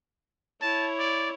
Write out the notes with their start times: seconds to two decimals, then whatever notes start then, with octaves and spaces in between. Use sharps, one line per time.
0.61 E4 C#5 A5
0.99 D5